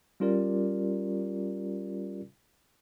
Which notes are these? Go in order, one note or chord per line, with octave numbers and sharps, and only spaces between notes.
G3 C#4 F4 G4 A#4 D5